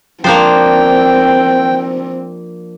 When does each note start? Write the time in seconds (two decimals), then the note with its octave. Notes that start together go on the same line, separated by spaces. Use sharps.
0.24 F3 A#3 C4 D4 C5 G5